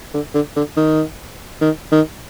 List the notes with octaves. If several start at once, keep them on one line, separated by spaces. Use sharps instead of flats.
D3
D3
D3
D#3
D#3
D#3